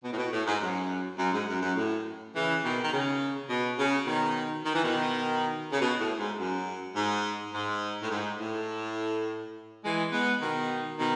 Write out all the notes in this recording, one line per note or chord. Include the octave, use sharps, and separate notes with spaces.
B2
A2
B2
A2
G#2
F#2
F#2
G#2
F#2
F#2
A2
C#3 E3
B2 D#3
D#3
C#3
B2
C#3
B2 D#3
D#3
E3
B2 D#3
C#3
B2
A2
G#2
F#2
G#2
G#2
A2
G#2
A2
E3 G#3
G#3 B3
B2 D#3
B2 D#3